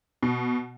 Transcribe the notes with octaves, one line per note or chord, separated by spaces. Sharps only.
B2